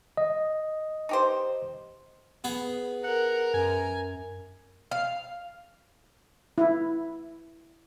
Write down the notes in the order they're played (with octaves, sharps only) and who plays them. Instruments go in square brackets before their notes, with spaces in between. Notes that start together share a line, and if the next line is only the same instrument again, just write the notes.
[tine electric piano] D#5
[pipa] D#4 G4 C5
[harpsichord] B3 G#4
[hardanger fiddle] A#4 [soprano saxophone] F#5
[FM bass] F#2 [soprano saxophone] G#5
[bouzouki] F5
[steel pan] E4